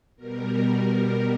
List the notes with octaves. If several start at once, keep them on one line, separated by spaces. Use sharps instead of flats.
B2 G3 A#4